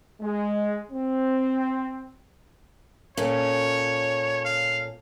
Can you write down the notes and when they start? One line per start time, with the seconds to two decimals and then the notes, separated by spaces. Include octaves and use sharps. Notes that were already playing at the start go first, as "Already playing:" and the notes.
0.21 G#3
0.92 C4
3.17 A#2 C#4 A4 C#5
4.45 F5